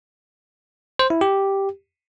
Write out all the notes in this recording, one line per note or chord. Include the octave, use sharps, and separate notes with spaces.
C5
E4
G4